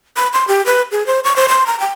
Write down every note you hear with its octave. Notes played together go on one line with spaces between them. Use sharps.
B5
C6
G4
B4
G#4
C5
C#6
C5
C6
A#5
G5